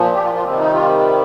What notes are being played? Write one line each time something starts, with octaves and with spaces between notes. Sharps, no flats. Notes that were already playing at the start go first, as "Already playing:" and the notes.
Already playing: A#2 F3
G4
F4
F4
C3 D#3 G3 C4
D#4
F4